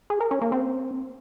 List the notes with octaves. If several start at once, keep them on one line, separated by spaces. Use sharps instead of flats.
G#4
A#4
C#4
A#3
C4